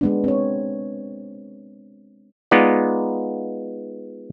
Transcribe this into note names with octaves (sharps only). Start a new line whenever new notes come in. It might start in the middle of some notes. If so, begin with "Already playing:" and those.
G#3 B3 D4
C4 C#5
G#3 B3 D#4 F4 D5